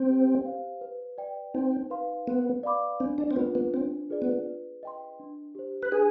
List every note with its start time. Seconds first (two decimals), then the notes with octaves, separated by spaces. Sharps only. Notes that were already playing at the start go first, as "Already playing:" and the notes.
Already playing: C4
0.09 G4
0.46 C5 F5
0.81 B4
1.18 D5 G5
1.54 C4 D#4
1.90 B4 F5 C6
2.27 B3 B4
2.63 D5 F5 B5 D6
3.00 C4 D4
3.18 D4
3.31 C4
3.36 B3 F4 B4
3.55 B3
3.73 C4 D4
4.10 F4 G#4 B4 D5
4.22 B3
4.46 B4
4.83 D#5 G5 C6
5.20 D4
5.55 G4 C5
5.83 B4
5.92 D4 G#4